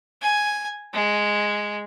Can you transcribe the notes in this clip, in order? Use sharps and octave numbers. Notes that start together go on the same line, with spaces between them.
G#5
G#3